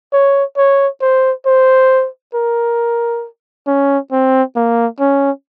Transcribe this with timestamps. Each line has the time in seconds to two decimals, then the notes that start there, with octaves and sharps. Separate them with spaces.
0.13 C#5
0.57 C#5
1.01 C5
1.46 C5
2.34 A#4
3.67 C#4
4.12 C4
4.56 A#3
5.00 C#4